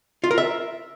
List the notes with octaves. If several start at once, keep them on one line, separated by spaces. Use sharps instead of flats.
F4
A#4
E5